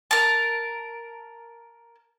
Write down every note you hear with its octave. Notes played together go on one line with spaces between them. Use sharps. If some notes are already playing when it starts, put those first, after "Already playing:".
A#4 A5